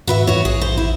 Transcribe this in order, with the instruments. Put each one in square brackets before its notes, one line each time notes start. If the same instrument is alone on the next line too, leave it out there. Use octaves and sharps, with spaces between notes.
[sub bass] G#2 [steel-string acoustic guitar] F#4 B4 E5
[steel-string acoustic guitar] F#4 C#5
[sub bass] A#1 [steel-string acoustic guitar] G#4
[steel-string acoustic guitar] C5
E4